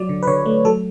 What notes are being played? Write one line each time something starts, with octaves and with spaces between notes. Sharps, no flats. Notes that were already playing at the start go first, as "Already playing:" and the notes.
Already playing: F#3 D5
D3
B4
D3 C#5
A3
F#3 A4